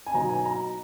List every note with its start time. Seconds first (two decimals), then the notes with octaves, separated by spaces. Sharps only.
0.06 G#5
0.14 B2 F#3 B3 D#4 A#5
0.30 G#5
0.45 A#5